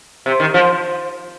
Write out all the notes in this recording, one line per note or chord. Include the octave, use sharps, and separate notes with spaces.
C3
D#3
F3